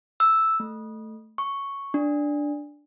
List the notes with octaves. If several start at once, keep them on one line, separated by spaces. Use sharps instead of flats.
E6
A3
C#6
D4